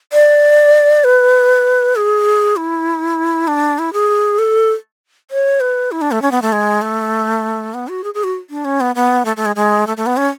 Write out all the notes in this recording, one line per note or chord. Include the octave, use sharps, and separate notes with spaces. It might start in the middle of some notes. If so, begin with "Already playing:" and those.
D5
B4
G#4
E4
D4
E4
G#4
A4
C#5
B4
E4
D4
A3
C#4
B3
A3
G#3
A3
B3
F#4
G#4
G#4
F#4
D4
C#4
B3
B3
A3
A3
G#3
G#3
A3
A3
B3
C#4